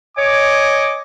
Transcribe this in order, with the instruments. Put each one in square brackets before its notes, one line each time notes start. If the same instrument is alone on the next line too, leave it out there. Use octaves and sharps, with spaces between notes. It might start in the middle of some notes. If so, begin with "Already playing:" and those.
[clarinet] C#5 [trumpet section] D#5 G#5 D6